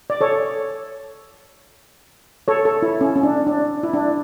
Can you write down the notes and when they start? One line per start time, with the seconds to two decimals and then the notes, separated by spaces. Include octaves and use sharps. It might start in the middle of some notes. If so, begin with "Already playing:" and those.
0.10 D5
0.21 A4 C#5
2.48 A4 C#5
2.65 A4
2.82 E4
3.01 C#4
3.16 C#4
3.23 D4
3.47 D4
3.83 E4
3.94 D4